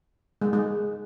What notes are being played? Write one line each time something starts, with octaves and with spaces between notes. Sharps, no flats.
G#3
G#3